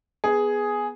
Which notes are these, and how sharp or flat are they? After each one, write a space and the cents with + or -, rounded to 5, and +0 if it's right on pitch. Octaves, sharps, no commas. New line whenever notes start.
B3 -5 G#4 +5